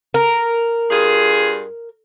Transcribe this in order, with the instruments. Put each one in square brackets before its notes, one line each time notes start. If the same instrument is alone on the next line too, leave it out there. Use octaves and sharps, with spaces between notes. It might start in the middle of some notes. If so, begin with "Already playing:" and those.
[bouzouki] A#4
[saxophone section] G2 F4 G#4